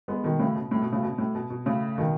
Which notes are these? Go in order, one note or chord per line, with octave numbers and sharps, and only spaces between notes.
G#3 B3
B2 D#3
A2 C#3
B2
A2
B2
A2 C#3
B2
A2
B2
B2
A2 C#3
B2 D#3